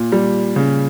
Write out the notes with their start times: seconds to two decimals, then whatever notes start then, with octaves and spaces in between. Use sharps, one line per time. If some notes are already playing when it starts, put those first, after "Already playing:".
Already playing: A#2
0.12 G3
0.56 C#3